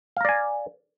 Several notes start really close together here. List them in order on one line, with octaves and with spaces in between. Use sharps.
F5 A#5 D5 G#5